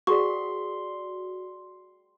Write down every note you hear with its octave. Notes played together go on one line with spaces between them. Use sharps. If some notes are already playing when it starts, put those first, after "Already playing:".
F#4 G#4 D5 F#5 C6 C#6